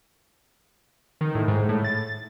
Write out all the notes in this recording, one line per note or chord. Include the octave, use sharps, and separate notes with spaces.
D#3
A2
G#2
A2
A6